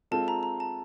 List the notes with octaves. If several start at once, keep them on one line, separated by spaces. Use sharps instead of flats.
G#3 C4 F4 A4 A5
A#5
A#5
A5